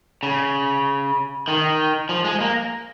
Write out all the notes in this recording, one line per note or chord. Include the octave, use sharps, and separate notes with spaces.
C#3
D#3
F3
G#3
A#3